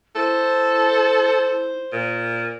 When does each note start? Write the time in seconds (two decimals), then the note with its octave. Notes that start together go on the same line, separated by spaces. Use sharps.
0.16 E4 A4 C5
1.93 A#2